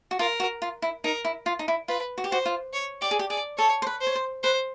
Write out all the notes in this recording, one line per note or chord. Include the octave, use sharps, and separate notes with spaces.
F#4
F4 A#4
F#4
F4
E4
D#4 A#4
E4
F4
D#4
E4
F4 B4
F#4
G4
F#4 C5
F4
C#5
G4 D5
G#4
G4
G#4 D5
A4 C#5
C5
B4
C5
C#5
C5
B4 C5